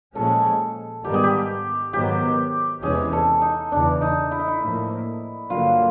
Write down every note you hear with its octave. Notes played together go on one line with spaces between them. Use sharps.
A#2 F3 G#3 C#4 A4
G#2 D#3 G3 B3 G4
G#4
G4
G#2 D#3 F#3 B3 G4
E2 C3 E3 G#3 C#4 G#4
A4
D#4
E2 C#3 E3 D4
D#4
E4
D#4
E4
A2 F3 A#3
G2 D3 F#3 A#3 F4